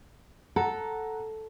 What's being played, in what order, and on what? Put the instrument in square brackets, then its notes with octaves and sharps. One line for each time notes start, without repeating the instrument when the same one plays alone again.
[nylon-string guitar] A4 [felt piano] F#5 A#5